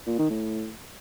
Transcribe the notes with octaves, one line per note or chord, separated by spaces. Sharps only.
A#2
D#3
A2